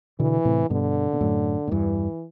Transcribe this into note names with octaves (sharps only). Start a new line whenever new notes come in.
B2 D3 E3
A2 C3
G2 B2 D3
B2
F#2 A2
A2
E2 G2 E3